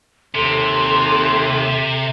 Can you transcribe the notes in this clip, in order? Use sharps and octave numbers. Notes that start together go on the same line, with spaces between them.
D#2 C3 A4 C6